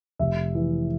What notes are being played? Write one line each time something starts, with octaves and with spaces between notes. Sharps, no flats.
F1 E5
E3